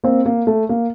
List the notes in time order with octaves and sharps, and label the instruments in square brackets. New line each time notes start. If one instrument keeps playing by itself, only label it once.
[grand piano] A#3 C4
A#3
A3
A#3